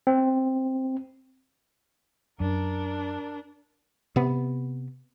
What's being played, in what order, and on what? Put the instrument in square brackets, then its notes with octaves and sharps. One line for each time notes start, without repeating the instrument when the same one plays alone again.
[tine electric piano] C4
[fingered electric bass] F#2 [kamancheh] D4 A#4
[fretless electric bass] C3 B3